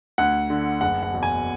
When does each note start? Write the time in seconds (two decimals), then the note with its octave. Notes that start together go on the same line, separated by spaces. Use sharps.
0.18 D2 F#5
0.50 D3
0.81 F#1 F#5
1.03 F#5
1.12 E2 B2
1.23 G#5